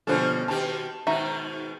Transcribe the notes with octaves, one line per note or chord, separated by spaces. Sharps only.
B2 D3 F3 G3 A#3 C#4 A4 C5
B2 D#3 G4 A5
G#2 B2 D#3 D#4 F#4 E5